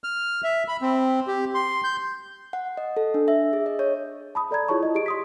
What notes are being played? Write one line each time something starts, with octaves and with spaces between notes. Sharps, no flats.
F6
E5
B5
C4
G4
C6
G6
F#5
D#5
A4
D4
E5
G#4
D#5
C#5
A5 B5 D#6
A4 D5 A#5 G#6
E4 F4 G#4 C#5 A5 C#6
E4 D#5
G4 G#4 D#5 D7
C6 D#6 B6